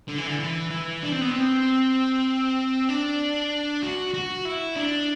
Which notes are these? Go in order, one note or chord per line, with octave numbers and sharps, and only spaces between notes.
D3
E3
D3
E3
E3
D4
C4
B3
C4
D4
F#4
F#4
E4
D4